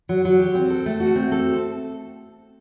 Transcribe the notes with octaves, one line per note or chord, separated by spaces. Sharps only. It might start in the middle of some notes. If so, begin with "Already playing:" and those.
F#3
F#3
G4
C4
A4
A3
F#4
C4
A4